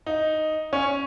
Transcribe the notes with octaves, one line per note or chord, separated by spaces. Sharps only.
D#4
C#4